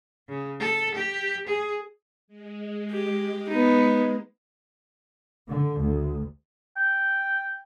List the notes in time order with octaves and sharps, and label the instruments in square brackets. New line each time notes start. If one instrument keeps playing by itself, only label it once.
[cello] C#3
A4
G4
G#4
[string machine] G#3
[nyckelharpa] G4
B3 D#4
[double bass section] D3
D2
[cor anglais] G5